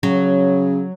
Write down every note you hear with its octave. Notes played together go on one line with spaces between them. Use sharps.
C#3 F#3